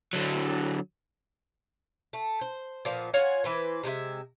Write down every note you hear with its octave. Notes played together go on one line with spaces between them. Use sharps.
D3 F#3
A3
C5
A#2 F3 B3
F4 C#5 F#5 G#5
E3 B4 C5
C3 G#3 B4 E5